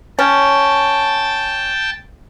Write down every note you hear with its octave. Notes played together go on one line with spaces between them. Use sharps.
C#4 G5 A5